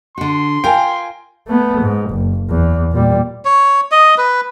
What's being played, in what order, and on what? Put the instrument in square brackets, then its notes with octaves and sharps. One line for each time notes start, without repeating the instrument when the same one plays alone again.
[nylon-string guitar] D3 F#4 [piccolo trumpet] C6
[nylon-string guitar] F4 A#4 [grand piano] G5 G#5
[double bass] A3 B3
G#2
F#1
E2
A#2 G3
[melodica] C#5
D#5
B4